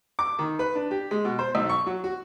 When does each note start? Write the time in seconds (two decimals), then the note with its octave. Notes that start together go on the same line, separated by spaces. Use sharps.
0.19 D6
0.39 D#3
0.59 B4
0.75 D4
0.91 G4
1.11 G#3
1.25 B2
1.39 C5
1.55 B1
1.69 C#6
1.86 F#3
2.04 F#4